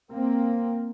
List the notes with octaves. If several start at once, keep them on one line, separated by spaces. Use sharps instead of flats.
A#3 C4